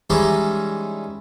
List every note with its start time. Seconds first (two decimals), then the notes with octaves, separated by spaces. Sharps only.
0.10 E3 G3 G#3 C#4 D#4 E4